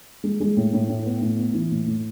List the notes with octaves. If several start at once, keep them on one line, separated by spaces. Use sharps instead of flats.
G#3
G#3
A2
A2
A2
B3
A2
B3
E3
A2
A2